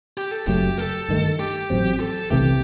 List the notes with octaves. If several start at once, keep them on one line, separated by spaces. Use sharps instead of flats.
G4
A4
F#1 F#2 F#3 A3 G4
A4
G2 D#3 A3
G4
A1 A2 F#3 C4
A4
C2 C3 E3 A3 G4